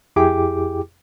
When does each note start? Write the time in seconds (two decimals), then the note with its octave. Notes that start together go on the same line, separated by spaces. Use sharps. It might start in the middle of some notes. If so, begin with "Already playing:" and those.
0.16 F2 E4 G4 G#4 G5 D6